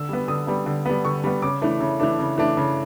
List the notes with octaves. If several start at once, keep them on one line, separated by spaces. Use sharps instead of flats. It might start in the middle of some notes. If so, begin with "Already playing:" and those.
Already playing: D3 E6
G3 B3
D3 D#6
G3 B3
D3
G3 B3
D3 C#6
G3 B3
C#3 D6
E3 A3 D4
C#3
E3 A3 D4
C#3
E3 A3 D4
C#3